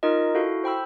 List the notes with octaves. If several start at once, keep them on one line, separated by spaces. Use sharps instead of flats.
D#4 F4 A#4 D#5
E4 F#4 A4 F5
C5 G5 B5 E6